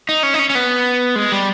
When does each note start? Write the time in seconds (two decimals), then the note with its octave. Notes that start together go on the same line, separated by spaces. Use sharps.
0.09 D#4
0.23 C#4
0.34 D#4
0.39 C#4
0.50 C#4
0.55 B3
1.16 G#3
1.32 G3